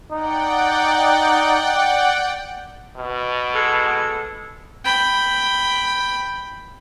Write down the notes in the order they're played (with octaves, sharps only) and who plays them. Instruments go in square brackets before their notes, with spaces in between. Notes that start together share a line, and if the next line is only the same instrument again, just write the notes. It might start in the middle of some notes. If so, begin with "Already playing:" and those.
[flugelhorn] D#4 [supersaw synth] D5 F#5 G5
[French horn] B2
[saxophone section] G#3 A4
[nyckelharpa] G5 B5